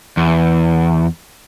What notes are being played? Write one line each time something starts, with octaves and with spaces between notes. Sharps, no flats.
E2